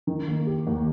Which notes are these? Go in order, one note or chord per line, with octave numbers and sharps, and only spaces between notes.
D#3
A#3
G4
D#2